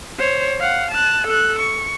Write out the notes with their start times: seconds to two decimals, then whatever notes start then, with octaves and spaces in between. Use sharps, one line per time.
0.19 C5 C#5
0.60 F5 F#5
0.91 A5 F#6
1.27 A4 F#6
1.59 C#6